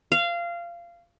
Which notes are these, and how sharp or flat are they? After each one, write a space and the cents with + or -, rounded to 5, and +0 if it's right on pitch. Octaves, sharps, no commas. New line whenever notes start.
F5 -20